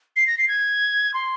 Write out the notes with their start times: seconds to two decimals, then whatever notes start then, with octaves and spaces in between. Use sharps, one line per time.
0.16 C7
0.27 A#6
0.38 C7
0.48 G#6
1.14 C6